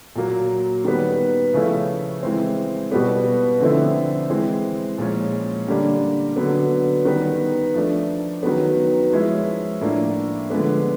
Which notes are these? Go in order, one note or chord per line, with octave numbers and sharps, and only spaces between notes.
A#2 F#3 A#3
D#3 G3 B3
C#3 F3 A3 C#4 E4
E3 G#3 C4
B2 G3 B3
D3 F3 A3 C4 E4
E3 G#3 C4
A#2 F3 G#3 C#4
D3 G3 A#3 D4
D3 F#3 B3
D#3 G3 B3
F3 A3 D4
D#3 F#3 B3
F3 G#3 C#4 E4
A2 F3 A#3 D4
D3 F3 G#3 B3